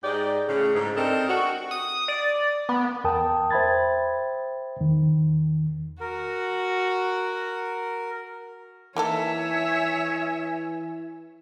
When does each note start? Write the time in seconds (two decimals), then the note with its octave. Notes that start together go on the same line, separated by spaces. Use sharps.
0.04 G#2 G#3 G4 D5 D#5
0.48 A2 C#3
0.75 G#2
0.97 C4 D4 D#4 A4 A#4
1.28 F#4
1.71 D#6
2.08 D5
2.69 B3
3.04 E2 A#4 G5 A5 D#6
3.51 C5 E5 G5 B5 G#6 A6
4.80 E2 D#3
6.00 F#4 A#4
8.96 E3 A#3 D#4 A4 C#5 E5 G#5